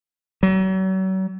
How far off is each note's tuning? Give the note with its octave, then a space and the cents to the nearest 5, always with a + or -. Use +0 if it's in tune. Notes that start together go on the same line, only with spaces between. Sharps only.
F#3 +40